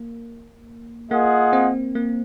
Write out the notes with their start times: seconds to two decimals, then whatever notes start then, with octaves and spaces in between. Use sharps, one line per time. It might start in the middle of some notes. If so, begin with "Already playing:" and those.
Already playing: A#3
1.11 A#3 F4 G#4 D#5 F#5
1.53 C4
1.95 A#3